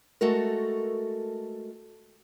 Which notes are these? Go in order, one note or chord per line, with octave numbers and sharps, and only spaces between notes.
G#3 A3 F#4 A4 A#4